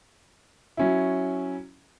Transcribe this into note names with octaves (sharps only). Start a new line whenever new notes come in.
F#3 C#4 E4